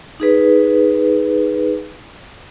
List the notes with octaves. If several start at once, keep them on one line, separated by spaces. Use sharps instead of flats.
D#4 G#4 B4